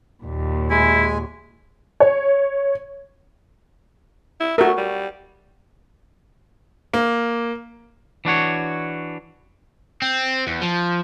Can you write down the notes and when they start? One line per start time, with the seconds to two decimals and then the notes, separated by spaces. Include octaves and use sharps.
0.22 D#2 A#2
0.70 G#3 E4 G#5
2.00 C#5
4.40 E4
4.58 A3 F#4 A#4
4.77 G3
6.94 A#3
8.25 E3 D4 F#4 C#5
10.02 C4
10.47 E2
10.62 F3